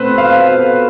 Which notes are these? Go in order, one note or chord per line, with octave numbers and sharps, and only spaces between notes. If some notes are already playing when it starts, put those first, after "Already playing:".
Already playing: B2 A3 C4 B4 C5
F5